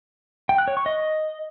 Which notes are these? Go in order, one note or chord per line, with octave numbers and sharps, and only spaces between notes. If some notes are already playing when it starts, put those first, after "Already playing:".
G5
F#6
C#5
C#6
D#5